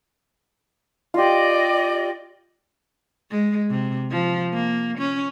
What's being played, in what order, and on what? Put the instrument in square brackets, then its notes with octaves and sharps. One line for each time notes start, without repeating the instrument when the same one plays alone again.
[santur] F4 G4 [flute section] D5 D#5
[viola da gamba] G#3
C3
F3
A#3
C#4